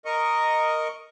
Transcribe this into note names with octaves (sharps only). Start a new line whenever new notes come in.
A#4 D#5 C#6